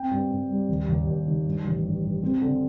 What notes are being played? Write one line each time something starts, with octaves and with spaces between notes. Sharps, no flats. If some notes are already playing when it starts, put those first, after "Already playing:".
Already playing: C4 G5
G2
G2
G3
D#2
D#2
D#2
D#3
G2
A1
G2
G2
C4
D3